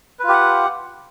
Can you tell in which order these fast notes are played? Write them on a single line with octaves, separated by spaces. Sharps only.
B4 F4 G4 F#5